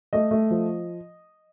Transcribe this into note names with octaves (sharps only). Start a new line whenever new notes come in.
A3 D#5
A3
F3